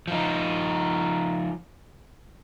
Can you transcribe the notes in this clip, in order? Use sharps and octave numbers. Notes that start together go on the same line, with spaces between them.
F3 D#4